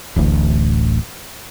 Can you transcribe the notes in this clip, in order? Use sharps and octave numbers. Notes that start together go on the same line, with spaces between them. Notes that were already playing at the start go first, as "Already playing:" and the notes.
D1 A1 D2